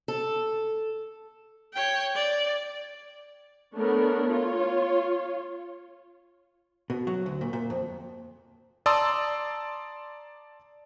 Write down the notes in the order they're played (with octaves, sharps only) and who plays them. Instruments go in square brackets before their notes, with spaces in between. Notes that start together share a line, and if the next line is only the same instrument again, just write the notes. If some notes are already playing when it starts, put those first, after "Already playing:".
[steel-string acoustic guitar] A4
[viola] C#5 G5
D5
[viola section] A3 B3 D4 A#4 C#5
F4 C#5
[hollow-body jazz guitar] B2
F#3
D2
A#2
A#2
F2
[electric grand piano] D5 A5 A#5 C6 D#6 E6